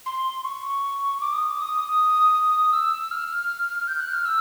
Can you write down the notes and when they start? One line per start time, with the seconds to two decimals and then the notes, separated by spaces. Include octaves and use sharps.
0.06 C6
0.44 C#6
1.21 D6
1.33 D#6
1.47 D6
1.59 D#6
2.73 E6
3.11 F6
3.88 G6
4.00 F#6
4.13 F6
4.25 E6